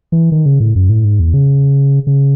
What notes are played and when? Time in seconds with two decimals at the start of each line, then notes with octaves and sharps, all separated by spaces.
0.12 E3
0.32 D#3
0.46 C#3
0.60 A2
0.76 F#2
0.89 A2
1.05 G#2
1.20 E2
1.34 C#3
2.07 C#3